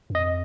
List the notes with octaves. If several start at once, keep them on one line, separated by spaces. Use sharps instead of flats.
F#2
F2 D#5